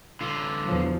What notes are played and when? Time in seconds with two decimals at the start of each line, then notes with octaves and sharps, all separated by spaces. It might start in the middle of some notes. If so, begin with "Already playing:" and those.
0.21 D3 F4
0.65 E2 F3 F#3